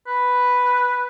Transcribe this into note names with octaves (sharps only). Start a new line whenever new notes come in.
B4